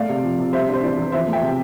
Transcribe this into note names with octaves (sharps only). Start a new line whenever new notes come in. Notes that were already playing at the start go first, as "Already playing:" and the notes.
Already playing: A3 D5 F5
C3
F3
C3
G3 C5 E5
D4 C5
E3 D5
E2
F3 C5 E5
A3
E5 G5
C3